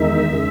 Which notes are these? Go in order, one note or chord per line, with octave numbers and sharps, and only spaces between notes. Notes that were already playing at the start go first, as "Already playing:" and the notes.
Already playing: E2 D#3 G#3 D#4 E5
C#3 G#3